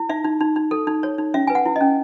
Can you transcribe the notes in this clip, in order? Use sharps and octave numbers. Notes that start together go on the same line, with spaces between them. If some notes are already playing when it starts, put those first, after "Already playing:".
Already playing: E4
D#4 E5
D#4
D#4
D#4
A4
D#4
C#5
D#4
C#4 E5
B4 G#5
F#5
E4
C#4 D#5